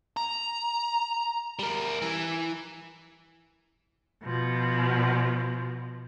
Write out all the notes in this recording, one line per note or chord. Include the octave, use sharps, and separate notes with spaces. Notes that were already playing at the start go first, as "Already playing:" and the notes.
A#5
G3 A#4
E3
B2 F3